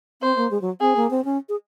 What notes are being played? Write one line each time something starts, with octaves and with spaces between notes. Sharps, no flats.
C4 C5
A#3
G#3
F#3
C4 G#4
A#3
C4
C#4
G#4